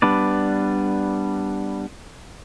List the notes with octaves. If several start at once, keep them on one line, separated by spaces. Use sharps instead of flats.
G3 B3 D4 B4 D5